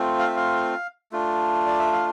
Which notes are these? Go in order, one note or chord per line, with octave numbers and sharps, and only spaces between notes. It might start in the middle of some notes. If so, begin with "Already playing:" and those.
Already playing: A3 C4 F4
F5
E5
F5
A3 D4 F4
D5
E5
F5